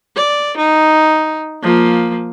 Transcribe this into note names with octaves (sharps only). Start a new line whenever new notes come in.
D5
D#4
F3 A#3